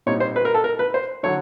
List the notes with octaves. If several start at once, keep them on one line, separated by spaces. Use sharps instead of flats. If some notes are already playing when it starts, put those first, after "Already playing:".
A#2 G3 C4 D#4 C#5
C5
B4
A#4
A4
A#4
B4
C5
D3 F#3 C#5